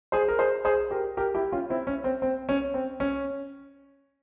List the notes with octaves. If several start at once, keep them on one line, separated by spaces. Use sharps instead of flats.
G#4 C5
A#4
G#4 C5
G#4 C5
G4 A#4
G4 A#4
E4 G4
C#4 F4
C4 E4
C#4
C4
C4
C#4
C4
C#4